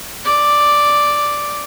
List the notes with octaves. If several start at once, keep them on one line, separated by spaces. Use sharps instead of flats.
D5